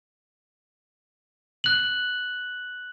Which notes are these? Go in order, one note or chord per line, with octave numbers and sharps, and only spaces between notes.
F#6 F#7